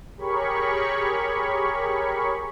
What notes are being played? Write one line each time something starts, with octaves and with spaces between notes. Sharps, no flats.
G4 G#4 A#4 C#5 B5 C#6